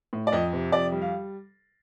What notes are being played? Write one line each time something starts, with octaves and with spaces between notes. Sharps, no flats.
A2
D5
F2 D#5
C3
F2 D5
G3
F5